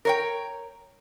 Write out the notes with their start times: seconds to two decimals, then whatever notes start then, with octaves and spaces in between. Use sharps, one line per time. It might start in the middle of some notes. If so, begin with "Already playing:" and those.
0.05 A#4 C#5 G5